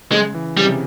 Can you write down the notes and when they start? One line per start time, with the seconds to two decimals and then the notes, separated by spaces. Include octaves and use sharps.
0.12 C#3 G#3
0.35 E3
0.57 C#3 G3
0.65 C3